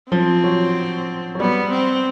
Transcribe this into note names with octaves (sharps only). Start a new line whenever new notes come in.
F3 C4
F#3
F#3
G3 B3
C4